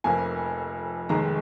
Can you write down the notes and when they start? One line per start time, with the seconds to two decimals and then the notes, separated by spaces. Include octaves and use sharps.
0.04 F1 F2 F3 A#3 G#5
1.09 F1 D#2 D#3 G#3 A#5